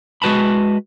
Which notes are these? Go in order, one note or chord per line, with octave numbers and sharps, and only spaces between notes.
G#3 F#4 B4 A5 B5